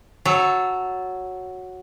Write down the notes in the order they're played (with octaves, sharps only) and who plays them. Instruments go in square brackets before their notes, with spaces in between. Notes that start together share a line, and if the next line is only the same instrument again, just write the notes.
[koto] F#3 A4